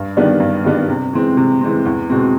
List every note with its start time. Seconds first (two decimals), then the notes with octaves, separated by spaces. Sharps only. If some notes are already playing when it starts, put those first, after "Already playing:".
Already playing: G2
0.17 D#3 G3 B3 D4
0.40 G2
0.64 D#3 G3 B3 D4
0.89 C3
1.13 E3 G#3 C4
1.37 C3
1.61 E3 G#3 C4
1.85 E2
2.10 B2 G#3 C4